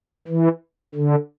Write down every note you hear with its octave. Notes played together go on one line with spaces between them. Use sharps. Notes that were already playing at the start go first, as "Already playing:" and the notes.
E3
D3